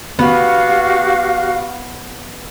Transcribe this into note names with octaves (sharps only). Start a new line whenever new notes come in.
B3 F#4 G4 F5